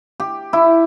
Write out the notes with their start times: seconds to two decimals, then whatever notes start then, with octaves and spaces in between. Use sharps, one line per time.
0.20 G4
0.53 E4